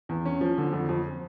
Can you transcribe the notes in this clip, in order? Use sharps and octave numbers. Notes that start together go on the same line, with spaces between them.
E2
C#4
F3
D3
F2
F2